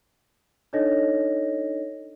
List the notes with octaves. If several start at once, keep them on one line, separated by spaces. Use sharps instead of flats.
D4 D#4 A4 C#5 D#5 A#6